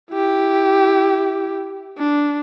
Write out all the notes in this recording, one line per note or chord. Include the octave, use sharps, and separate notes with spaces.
E4 G4
D4